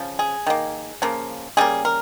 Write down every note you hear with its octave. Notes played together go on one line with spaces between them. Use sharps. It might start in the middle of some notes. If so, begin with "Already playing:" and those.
Already playing: C#3 F3
G#4
D#3 A#3
C#3 F3 A#3
C#3 G3 A#3 G#4
A#4